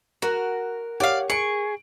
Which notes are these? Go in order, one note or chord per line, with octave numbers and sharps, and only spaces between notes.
F#4 A#4
G4 C#5 D5 F5 F#5
G#4 C#6 D7 F#7